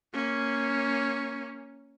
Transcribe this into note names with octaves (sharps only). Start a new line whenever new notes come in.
A#3 C#4